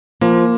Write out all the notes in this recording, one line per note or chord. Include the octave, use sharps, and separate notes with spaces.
F3 A#3